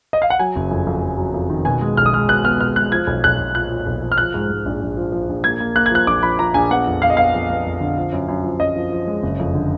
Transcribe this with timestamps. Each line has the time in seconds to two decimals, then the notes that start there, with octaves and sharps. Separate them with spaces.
0.13 D#5
0.22 F5
0.30 F#5
0.39 F#3 G#5
0.56 F#1
0.71 F2
0.87 F2
1.03 F2
1.18 F#3
1.34 F2
1.50 D#3
1.65 B2 G#5
1.81 G#3
1.97 B1 F6
2.06 D#6
2.13 G#3 F6
2.29 B2 F#6
2.44 B3 F6
2.60 B2 F6
2.76 G#3 F#6
2.92 F3 G#6
3.07 B1
3.24 B1 F#6
3.39 B1
3.55 A#2 F#6
3.70 A#2
3.86 B1
4.02 F3
4.12 F6
4.18 F3 F#6
4.34 G#2
4.50 G#2
4.66 A#1
4.81 A#1
4.97 F3
5.12 F3
5.29 A#1
5.44 A#3 G#6
5.60 A#3
5.75 A#3 F#6
5.86 G#6
5.91 F3 F#6
6.07 A#1 D6
6.23 F3 B5
6.39 F3 A#5
6.54 A#1 G#5
6.71 B3 F#5
6.87 F2
7.02 F2 F5
7.10 D#5
7.17 B3 F5
7.34 F2
7.50 B3
7.65 F2
7.80 D3
7.97 F3
8.12 F#2
8.28 F#2
8.44 F3
8.60 F#2 D#5
8.76 F3
8.92 F3
9.07 G#3
9.23 F#1
9.39 F2
9.54 D3